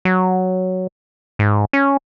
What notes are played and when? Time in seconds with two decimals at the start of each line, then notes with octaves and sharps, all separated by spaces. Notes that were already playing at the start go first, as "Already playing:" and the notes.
0.05 F#3
1.39 G#2
1.73 C#4